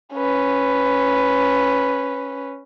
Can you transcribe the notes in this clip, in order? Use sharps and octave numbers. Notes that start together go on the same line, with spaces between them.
C#4 B4